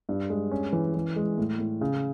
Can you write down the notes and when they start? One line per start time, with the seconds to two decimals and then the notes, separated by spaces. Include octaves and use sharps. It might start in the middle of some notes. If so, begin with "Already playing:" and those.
0.09 G2
0.30 G#3
0.51 C#4
0.72 E3
0.94 E3
1.16 G#3
1.38 A2
1.59 A2
1.81 C#3